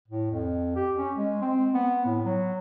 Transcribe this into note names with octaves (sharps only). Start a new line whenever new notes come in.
A2
F2
G4
C#4
G#3
C4
B3
A2
F#3